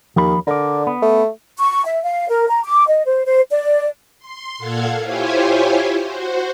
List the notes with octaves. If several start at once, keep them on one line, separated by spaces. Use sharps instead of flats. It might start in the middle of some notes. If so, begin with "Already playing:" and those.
D#2 F3 B5
D3 A#4 D5
B3
A3
C#6
E5
F5
A#4
A#5
D6
D#5
C5
C5
D5
C6
A#2 A4 F5 F#5 G#6
E4 F4 G4 C5 C#5 G#5
F#4 C5